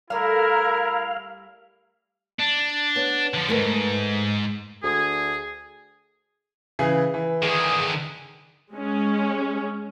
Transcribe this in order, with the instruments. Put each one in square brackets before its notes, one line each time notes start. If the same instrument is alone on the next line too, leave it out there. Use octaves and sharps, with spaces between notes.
[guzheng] G3 A3 [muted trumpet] E4 [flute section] A#4 [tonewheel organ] F5
[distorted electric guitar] D4
[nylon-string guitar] B3 C#5
[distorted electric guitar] D3 F3
[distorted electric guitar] D#2 G#2 [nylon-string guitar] A3 A#4 B4
[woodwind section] D2 G#4
[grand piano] C#3 E3 G#4
E3
[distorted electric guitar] D3 D#3 [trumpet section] G#4
[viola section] G#3 C#4